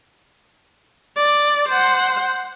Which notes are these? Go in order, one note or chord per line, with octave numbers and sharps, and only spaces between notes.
D5
C5 F#5